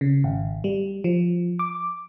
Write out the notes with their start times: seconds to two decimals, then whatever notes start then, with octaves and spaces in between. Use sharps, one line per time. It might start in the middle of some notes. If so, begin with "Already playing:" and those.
0.01 C#3
0.24 G#1
0.64 G3
1.04 F3
1.59 D6